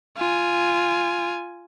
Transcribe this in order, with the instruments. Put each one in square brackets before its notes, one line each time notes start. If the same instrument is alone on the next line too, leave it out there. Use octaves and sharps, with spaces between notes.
[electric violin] F4 G#5